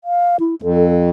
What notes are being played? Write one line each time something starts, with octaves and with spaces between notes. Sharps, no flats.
F5
E4
F2 A4